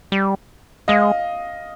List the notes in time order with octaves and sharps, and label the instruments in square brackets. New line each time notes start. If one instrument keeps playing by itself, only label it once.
[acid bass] G3
[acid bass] G#3 [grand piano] D#5 F5